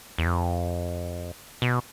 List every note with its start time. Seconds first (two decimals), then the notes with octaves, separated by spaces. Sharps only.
0.18 E2
0.26 F2
1.62 B2